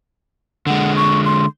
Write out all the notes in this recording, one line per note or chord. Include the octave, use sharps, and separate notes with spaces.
D3 G#3 F#5
C#6
C6